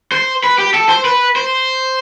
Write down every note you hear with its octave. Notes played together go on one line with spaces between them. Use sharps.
C5
B4
G4
A4
C5
B4
C5